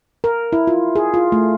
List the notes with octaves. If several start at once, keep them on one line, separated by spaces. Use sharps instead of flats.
A#4
E4
F4
G#4
F4
A3